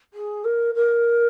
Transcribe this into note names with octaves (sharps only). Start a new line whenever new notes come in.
G#4
A#4
A#4